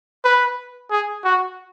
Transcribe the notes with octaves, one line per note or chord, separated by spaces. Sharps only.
B4
G#4
F#4